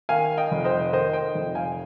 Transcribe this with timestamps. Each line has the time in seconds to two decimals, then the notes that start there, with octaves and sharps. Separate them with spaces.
0.09 D#3 F5 G#5
0.38 D#5 G5
0.51 F1
0.65 C5 D#5
0.93 D#3 C5 D#5
1.13 D#5 G5
1.35 F1
1.55 F5 G#5